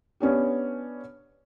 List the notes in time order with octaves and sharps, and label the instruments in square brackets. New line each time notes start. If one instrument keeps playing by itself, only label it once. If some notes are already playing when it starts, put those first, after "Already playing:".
[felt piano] B3 C#4 D4 G4